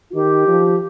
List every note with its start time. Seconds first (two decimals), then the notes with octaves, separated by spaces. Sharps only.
0.10 F4
0.14 D#3 G4
0.48 F3